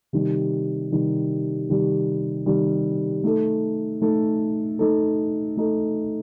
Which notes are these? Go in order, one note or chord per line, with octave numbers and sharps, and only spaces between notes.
C3 D#3 G3
C3 D#3 G3
C3 D#3 G3
C3 D#3 G3
A3 D#4 A4
A3 D#4 A4
A3 D#4 A4
A3 D#4 A4